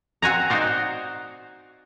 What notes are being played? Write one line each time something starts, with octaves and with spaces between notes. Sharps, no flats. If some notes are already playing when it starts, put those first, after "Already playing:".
C4 F#4 G#5 A#5
D#4 F#4 C5 D5